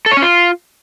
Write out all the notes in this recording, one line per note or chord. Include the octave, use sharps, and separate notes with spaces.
A4
C#5
C#4
F4